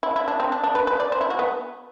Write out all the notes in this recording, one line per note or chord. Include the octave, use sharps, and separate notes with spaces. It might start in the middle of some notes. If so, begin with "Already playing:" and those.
E4
E4
D4
C4
D4
D4
B4
B4
D5
C5
E4
F#4
B3